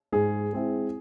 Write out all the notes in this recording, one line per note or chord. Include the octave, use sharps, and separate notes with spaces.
G#2 G#4
G#3 C4 E4